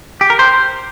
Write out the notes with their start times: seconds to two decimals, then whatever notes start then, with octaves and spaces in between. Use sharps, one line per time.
0.21 G4
0.30 A#4
0.39 C5